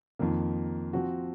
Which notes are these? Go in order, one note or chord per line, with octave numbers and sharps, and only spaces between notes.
F2 D#3 A#3
F3 C4 F#4